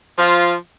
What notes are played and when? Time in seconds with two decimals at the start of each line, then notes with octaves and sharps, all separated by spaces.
0.17 F3 F4